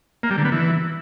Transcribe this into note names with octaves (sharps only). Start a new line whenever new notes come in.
A#3
G3
D3
B3
E3